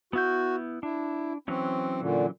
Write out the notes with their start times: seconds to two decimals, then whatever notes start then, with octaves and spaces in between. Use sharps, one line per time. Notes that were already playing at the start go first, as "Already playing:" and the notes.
0.13 B3 E4 F#4 G6
0.83 D4 E4
1.48 E3 F#3 C4 C#4
2.01 A#2 D3